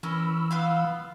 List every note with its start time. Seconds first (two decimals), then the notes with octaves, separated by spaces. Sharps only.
0.03 E3 C#4 A#4 B5 E6
0.51 B3 F4 F5